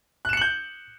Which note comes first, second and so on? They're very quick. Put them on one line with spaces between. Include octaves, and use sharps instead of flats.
F#6 E7 C#7 F#7 G6